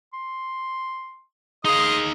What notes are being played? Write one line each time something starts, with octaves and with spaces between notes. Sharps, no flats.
C6
D#4 G#4 D#5 F5 C6 D#6